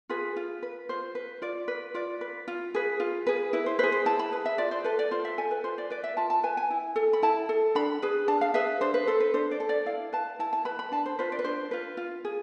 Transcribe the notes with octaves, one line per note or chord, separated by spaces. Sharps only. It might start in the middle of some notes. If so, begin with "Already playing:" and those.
F4 G#4 B4
F4
B4
F4 C5
B4
F4 D5
B4
F4 D5
B4
F4
G#4 B4
F4
G#4 B4
E4 B4
C5
G#4 B4 C5
C5
E4 A5
B5
G#4 B4
E5
F4 D5
C5
A4 B4
D5
F4 C5
E5
A4 G#5
B4
F4 C5
D5
B4 D5
E5
F4 A5
A5
B4 G#5
G#5
E4
A4
B5
E4 A5
A4
D4 B5
G#4 B4
D4 A5
F5
G#4 B4 E5
D4 C5
B4
A4 C5
B4
D4 C5
D5
A4
D5
E4 F5
B4 A5
E4 A5
A5
B4 B5
B5
D4 A5
C5
F4 B4 C5
D5
B4
D4 C5
F4 B4
F4
G#4